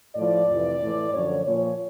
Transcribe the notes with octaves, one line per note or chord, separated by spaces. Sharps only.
A2 F3 D5
F2 C3 E3
A2 E3
F#2 D3 F3 C#5
A#2 F3 C#5